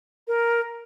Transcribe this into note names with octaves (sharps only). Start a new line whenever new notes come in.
A#4